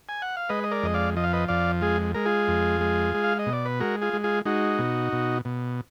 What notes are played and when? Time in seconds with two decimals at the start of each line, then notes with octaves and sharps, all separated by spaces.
0.09 G#5
0.22 F#5
0.37 F5
0.49 G#3 B4 D#5
0.64 D#5
0.71 A#4 D5
0.83 F2 D#5
0.94 D5 F5
1.16 F3 D#5
1.24 F5
1.33 B4 D#5
1.48 F2 D5 F5
1.81 G#3 F4 G#4
2.15 G#3 A#4
2.25 F4 G#4
2.48 F2
2.81 G#3
3.14 G#3
3.24 F5
3.39 D#5
3.46 B2
3.53 D5
3.66 B4
3.80 G#3 F#4 A#4
4.02 F4 G#4
4.13 G#3
4.24 F4 G#4
4.45 G#3 D#4 F#4
4.79 B2
5.13 B2
5.45 B2